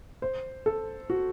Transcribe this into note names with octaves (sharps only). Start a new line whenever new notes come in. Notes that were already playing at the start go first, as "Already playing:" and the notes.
C5
A4
F#4